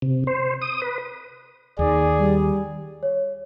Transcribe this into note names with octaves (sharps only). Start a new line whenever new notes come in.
C3
C5
D#6
B4
D#2 D#3 G#4 D5
G3
C#5